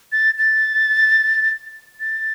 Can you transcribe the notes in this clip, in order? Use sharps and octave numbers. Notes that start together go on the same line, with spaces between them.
A6
A6
A6